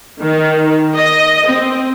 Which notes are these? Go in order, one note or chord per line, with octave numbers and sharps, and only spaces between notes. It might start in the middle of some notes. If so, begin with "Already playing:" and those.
D#3
D#5
C4